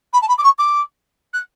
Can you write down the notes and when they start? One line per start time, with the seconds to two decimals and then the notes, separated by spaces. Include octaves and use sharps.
0.13 B5
0.22 A5
0.28 B5
0.38 D6
0.44 C#6
0.58 D6
1.33 F#6